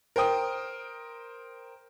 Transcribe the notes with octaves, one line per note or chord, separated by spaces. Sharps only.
A#4 C5 G5 D#6